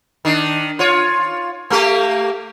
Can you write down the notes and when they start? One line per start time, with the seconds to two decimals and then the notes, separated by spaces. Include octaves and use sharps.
0.25 D#3 D4
0.79 F4 C#5
1.70 A3 A#3 G4